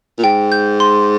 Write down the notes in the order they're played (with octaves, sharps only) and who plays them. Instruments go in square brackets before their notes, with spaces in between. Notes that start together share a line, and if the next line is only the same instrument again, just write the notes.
[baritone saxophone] A#2
[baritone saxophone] G#2 [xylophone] G5
[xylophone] G6
C6